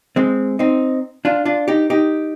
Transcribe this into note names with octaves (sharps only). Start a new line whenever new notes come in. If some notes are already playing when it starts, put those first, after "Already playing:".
G#3 C4
C4 D#4
D4 F4
D4 F4
D#4 G4
D#4 G4